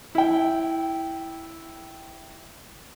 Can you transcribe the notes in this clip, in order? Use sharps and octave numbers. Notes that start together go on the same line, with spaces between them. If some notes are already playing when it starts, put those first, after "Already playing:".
E4 G5